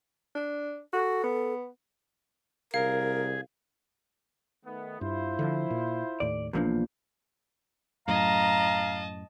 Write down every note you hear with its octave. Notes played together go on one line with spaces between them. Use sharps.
D4
F#4 A4
B3
C2 G#4 A#4 F5
D#3 A3 B3
G2 E4 F4 C5
D3 D#3 F3
A#2
D#2 A2 D5
B1 E2 A#2 F3 A#3 D4
F#2 A2 D#5 F5 A5 A#5